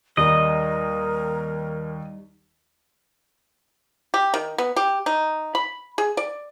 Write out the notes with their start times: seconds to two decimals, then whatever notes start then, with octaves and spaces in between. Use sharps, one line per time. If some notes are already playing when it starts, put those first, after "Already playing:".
0.17 D#2 G3 D#4 A#4 D#5
4.14 G4
4.34 D#3
4.58 B3
4.76 G4
5.06 D#4
5.55 B5
5.98 G#4
6.17 D5